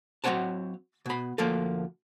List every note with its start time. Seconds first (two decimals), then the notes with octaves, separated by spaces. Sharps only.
0.24 F#3 G#3 C4 C#5 F#5 A5
1.06 B2 B5
1.38 D2 F3 A#3 A4